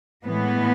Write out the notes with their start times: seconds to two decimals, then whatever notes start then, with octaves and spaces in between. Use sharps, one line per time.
0.25 A2 E3 G#3 B3